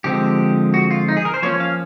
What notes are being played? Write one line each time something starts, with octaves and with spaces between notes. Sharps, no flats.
D3 F3 G#3 C4 G4
F#4
F4
D#4
G#4
A#4
C5
F3 A#3 C#4 C#5
F5